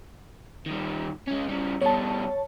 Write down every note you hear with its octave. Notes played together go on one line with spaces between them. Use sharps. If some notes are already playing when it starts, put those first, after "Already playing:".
D#3 G3
G#3 C#4
C#3 G3
B2 G3 C#5 A5